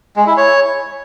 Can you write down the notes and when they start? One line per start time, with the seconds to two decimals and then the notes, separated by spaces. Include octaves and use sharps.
0.16 G#3
0.27 E4
0.37 C#5